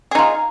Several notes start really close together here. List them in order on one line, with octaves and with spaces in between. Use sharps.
G#4 D#4 F4